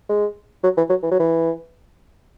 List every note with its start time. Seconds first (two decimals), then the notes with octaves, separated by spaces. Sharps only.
0.09 G#3
0.63 F#3
0.77 E3
0.90 F#3
1.03 E3
1.11 F#3
1.19 E3